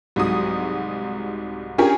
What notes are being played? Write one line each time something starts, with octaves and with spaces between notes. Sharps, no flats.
C2 G#2 F#3 D#6
C#4 D4 F4 G4 G#4 A#4